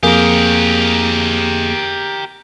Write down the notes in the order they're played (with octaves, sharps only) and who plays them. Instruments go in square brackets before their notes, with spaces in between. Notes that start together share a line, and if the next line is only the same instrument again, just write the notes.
[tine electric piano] F2 A#3 G#4 [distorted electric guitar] G4 A#4